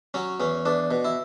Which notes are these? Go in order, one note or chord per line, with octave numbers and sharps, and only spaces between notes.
F#3 C#4
E2 C#4
E2 D4
B2
E4